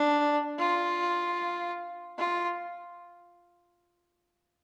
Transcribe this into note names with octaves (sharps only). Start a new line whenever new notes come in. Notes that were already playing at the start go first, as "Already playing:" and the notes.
Already playing: D4
F4
F4